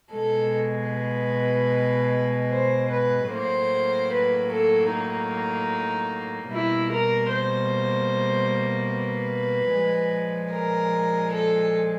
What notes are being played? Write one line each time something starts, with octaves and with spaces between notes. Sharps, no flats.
B2 G#3 A4
B4
C5
B4
A2 F#3 A#3 C5
B4
A4
D#4
B2 G3 A#3 E4
A#4
C5
B4
A#2 F3 G#3
A#4
A4